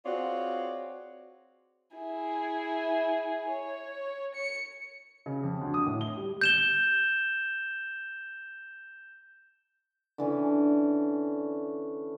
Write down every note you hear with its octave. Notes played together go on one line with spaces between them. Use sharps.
C4 F4 F#4 G#4 C#5 D5
E4 G#4
C#5
C#7
C#3
F2
D2
D#6
A2
G7
G3
G6 E7 G7
D3 E3 C#4